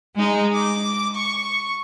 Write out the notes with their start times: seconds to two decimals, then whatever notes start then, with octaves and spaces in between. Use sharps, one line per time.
0.15 G#3 D#4
0.54 D6
1.14 C#6